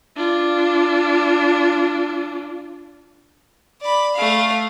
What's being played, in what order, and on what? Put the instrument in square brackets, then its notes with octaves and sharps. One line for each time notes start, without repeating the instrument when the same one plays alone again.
[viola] D4 F4
[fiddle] D5 B5
A3 F5